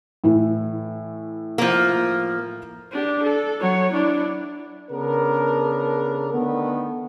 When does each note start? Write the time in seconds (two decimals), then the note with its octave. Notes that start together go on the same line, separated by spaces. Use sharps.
0.24 A2 E3 E4
1.58 F3 A#3
2.92 D4 G4
3.23 A4
3.61 F#3 C#5
3.92 D4 E4
4.89 C#3 B3 D4 A4 A#4
6.33 D3 D#3 A3 B3